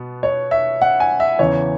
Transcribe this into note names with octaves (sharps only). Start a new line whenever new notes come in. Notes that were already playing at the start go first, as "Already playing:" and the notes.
Already playing: B2 B3
C#5
E5
F#5
G#5
E5
E2 C#3 E3 C#5